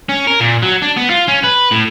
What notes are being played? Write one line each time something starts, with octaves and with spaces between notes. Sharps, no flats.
C#4
A#4
A#2
F#3
D4
B3
F4
C#4
B4
A2